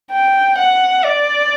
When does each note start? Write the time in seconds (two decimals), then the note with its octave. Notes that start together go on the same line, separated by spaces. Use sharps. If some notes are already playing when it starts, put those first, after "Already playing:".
0.12 G5
0.58 F#5
1.05 D5